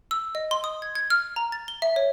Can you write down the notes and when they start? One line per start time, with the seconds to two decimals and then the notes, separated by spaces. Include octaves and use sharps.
0.11 E6
0.35 D#5
0.51 C6
0.64 D#6
0.82 G#6
0.95 G#6
1.10 F6
1.36 A#5
1.52 A6
1.68 G7
1.82 E5
1.96 C#5